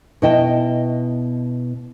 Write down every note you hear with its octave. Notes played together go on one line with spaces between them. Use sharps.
B2 E4 D#5 G5 A5